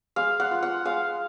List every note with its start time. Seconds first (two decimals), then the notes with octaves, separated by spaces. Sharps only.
0.16 G#3 F5
0.40 F#5
0.51 F4
0.62 F#5
0.85 G#3 F5